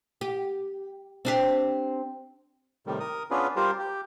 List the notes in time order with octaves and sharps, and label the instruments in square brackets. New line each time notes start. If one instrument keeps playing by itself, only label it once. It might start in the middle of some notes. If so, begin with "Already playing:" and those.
[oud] G4
C4 D4 G4
[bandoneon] A2 C3 D#3 G3
A#4 D#6
B3 C#4 D4 F4 G#4 B4
G3 F4 G4 A#4 C5
G4